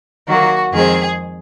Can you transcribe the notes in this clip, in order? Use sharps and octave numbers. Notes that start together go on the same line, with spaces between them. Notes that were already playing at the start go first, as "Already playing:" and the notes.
D#3 F#3 A#3 F#4
F2 D#3 G#3 C4 G#4